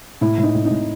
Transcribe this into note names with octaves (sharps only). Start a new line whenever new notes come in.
A2 E4
A2
D#4
A2
A2 D#4